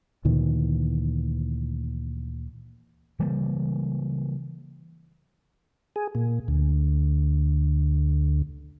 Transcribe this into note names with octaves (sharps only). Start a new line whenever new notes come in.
D2 A#2 D#3 E3
C#3 E3 G3 A#3
G#4
A#2
D2